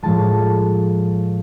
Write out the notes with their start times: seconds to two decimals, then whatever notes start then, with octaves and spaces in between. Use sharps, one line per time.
0.03 A2 F3 G#3 A5